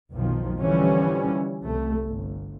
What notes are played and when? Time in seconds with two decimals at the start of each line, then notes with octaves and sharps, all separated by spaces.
0.13 F1 B1 D#3 F3
0.59 D3 E3 F3 G3 C#4
1.65 C2 A3
2.03 G1